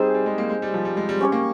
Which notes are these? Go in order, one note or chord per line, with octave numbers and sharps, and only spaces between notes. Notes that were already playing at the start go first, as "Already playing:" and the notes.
Already playing: G3 C4 D#4 G#4 C5
G3
G#3
A#3
G#3
G3
F3
G3
G#3
G3
C#4 G4 C#5
A#3